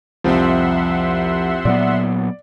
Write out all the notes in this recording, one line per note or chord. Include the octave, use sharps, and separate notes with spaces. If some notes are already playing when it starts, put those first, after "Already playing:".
C2 F2 F3 C4 E5 F#5 C6
A#2 F#3 B3 D5